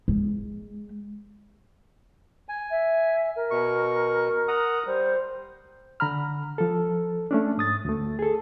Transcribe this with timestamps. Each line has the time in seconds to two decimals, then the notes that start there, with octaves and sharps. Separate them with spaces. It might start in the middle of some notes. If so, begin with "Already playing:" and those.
0.08 G#3
2.49 G#5
2.71 E5
3.36 A#4
3.51 B2 C#6
4.48 F#5 A#5 D#6
4.86 G3 C5
6.00 D3 A#5 B5 F6
6.58 F3 A4
7.31 A3 C#4 D4
7.58 G#2 D#6 A6
7.85 D2 A3
8.19 G#4 A4